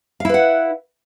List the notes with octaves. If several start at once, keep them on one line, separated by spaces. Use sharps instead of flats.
E4 B4 F5 F#5